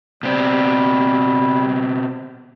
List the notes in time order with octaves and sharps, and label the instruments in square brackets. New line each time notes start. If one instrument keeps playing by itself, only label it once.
[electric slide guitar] B2 C4 [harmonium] G3